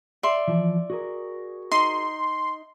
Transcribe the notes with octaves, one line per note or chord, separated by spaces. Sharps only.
D5 E5 C6
E3 F3
F#4 G#4 A#4
D#4 C6